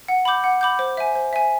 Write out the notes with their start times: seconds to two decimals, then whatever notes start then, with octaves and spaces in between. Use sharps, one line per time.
0.08 F#5
0.25 B5 D6 G6
0.44 F#5
0.61 B5 D6 G6
0.79 C5
0.97 E5 G#5
1.15 C5
1.33 E5 G#5